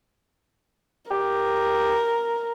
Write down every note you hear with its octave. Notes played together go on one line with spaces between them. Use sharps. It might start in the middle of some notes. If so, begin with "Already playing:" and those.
G4 A#4